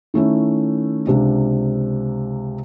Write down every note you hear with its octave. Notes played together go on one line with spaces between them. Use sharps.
D#3 A3 C#4 E4
C#2 C3 D4